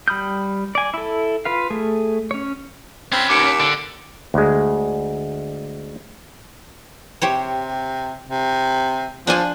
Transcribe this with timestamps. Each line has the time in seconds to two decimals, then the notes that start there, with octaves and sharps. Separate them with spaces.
0.08 G3 B5 D#6 F6 G6
0.75 D5 G#5
0.94 E4 A4
1.45 F4 B4 F5
1.70 A3 G#4
2.31 C#4 C#5
3.12 C4 C#4 B4
3.29 D#2 D6 C#7 D7
3.60 D3 D7
4.34 D2 G#3
7.22 C3 G4 C5 C#5
8.29 C3
9.27 F3 D4 C5 G#5